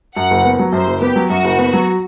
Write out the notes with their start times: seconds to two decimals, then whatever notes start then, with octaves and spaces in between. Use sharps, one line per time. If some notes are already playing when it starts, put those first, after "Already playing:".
0.17 F#2 F#5
0.31 F#1
0.45 B3
0.59 F#3
0.73 F#2 C5
0.87 F#1
1.02 B3 G4
1.16 F#3
1.30 F#2 F#4
1.44 F#1
1.59 B3
1.73 F#3